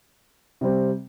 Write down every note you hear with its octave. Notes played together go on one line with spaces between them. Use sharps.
C3 G3 C4